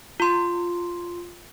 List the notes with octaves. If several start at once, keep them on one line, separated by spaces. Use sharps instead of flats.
F4 C6